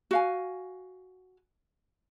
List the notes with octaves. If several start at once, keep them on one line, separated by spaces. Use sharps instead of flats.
F#4 F5 G#5